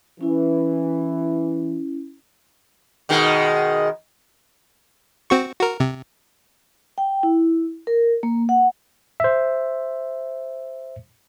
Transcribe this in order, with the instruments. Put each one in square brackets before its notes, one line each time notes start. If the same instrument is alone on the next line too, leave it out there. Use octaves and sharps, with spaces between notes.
[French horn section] E3 [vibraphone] C#4 E4
[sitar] B2 D#3 G#3
[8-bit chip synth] C4 F#4 C#6
F#4 A#4
C3
[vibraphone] G5
E4
A#4
A#3
F#5
[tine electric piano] C5 E5